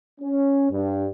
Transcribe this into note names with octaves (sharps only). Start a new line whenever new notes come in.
C#4
G2